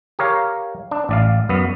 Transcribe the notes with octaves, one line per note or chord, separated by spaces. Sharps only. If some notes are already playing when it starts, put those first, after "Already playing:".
G4 A#4 C#5 F5
D4
A1 D5 F5
F#2 B3